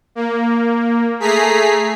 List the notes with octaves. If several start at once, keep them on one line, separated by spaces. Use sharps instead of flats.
A#3
A3 G#4 A#5 B6 C7